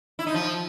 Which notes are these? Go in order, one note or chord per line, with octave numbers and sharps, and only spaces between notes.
E4
D#4
F3